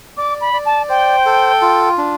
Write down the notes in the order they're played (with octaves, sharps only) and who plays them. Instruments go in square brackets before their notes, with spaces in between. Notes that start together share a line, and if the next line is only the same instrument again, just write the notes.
[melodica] D5 [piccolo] D6
[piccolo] B5
[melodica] D5
[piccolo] A5
[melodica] C5 [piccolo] G5
[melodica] A4
F4
D4